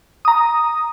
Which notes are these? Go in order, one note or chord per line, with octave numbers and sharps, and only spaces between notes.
A#5 D#6